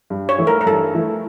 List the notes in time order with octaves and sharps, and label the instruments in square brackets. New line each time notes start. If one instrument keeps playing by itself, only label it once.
[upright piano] G2
[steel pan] C#5
[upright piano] E3 A3 E4
[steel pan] A#4
A#4
[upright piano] G2 [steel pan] A4
[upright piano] E3 A3 E4